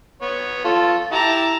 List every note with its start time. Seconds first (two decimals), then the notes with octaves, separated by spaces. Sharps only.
0.22 B3 C#5
0.64 F4 A4
1.12 E4 G4 A5 A#5